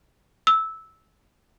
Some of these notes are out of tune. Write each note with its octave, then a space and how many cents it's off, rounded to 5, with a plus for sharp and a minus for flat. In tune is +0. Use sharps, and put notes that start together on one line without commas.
E6 -15